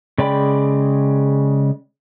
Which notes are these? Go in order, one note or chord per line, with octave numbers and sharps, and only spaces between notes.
C#3 G#3 D5 G5 B5